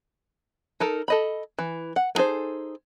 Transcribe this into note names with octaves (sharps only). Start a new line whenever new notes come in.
D#4 A4 A#4
A4 D#5 B5
E3
F#5
B3 D#4 G#4 A4 C5